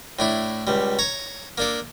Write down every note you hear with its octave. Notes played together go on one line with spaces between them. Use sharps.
A2 D4 E4
C#2 G3
C#5 A#5
A#3 D4 A4